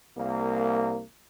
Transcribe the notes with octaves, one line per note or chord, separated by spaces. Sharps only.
C2 A#3